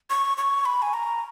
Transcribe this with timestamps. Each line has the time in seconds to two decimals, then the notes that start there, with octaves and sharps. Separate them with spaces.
0.10 C#6
0.37 C#6
0.65 B5
0.82 G#5
0.94 A#5